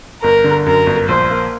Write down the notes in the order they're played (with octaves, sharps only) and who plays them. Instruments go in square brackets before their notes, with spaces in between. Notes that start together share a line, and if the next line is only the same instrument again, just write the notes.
[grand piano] G1 [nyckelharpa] A#4
[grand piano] D3
[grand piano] F#2 [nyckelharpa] A#4
[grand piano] G1
[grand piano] A#1 [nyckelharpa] C5
[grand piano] A#3